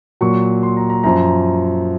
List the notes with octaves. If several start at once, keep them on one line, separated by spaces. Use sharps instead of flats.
A#2 F#3 C#6
C6
A#5
A#5
F#2 F3 A#5